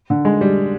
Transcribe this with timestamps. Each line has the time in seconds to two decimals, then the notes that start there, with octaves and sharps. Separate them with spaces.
0.10 D3
0.25 G#3
0.41 G3